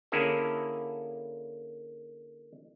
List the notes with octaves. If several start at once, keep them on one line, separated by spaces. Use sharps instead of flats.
D3 A#3 C#4 E4 G#4 A4